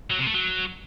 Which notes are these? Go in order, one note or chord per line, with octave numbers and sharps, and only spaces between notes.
F#3
C3
A3
F#3